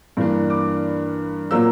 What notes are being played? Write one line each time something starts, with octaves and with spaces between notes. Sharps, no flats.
G2 E3 A#3 D4
D6
A#2 F#3 A#3 E6